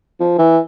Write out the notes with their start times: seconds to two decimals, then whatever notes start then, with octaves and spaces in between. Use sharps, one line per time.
0.20 F3
0.38 E3